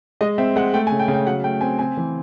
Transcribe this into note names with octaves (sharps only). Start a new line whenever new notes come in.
G#3 D#5
C4 E5
G#3 F#5
A3 G5
G#5
C#3
G5
C#3
G5
F#3 F#5
A3 G5
C4 G#5
C4 G#5
E3